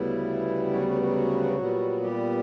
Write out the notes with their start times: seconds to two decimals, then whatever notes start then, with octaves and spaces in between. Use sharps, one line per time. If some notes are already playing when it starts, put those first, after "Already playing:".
Already playing: D2 C#3 G3 B3 E4
0.73 F#3 F#4
0.88 F#3 F#4
1.02 F#3 F#4
1.59 A#2 G3 B3
2.01 G3 G4